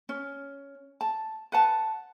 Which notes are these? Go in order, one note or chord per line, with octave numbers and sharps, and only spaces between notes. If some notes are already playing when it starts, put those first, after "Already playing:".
C#4
A5
B4 F#5 A5